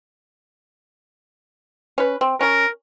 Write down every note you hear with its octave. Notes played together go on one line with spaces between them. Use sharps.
C#4 B4
C4
C#4 A#4 A#5